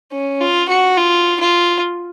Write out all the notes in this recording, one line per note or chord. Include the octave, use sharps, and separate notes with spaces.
C#4
F4
F#4
F4
F4